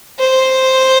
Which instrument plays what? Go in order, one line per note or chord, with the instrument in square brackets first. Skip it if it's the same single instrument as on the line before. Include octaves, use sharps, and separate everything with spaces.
[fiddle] C5